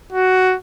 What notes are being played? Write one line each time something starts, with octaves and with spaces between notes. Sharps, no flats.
F#4